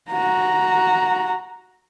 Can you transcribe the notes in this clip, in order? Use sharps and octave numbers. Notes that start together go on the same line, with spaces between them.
F#4 A#5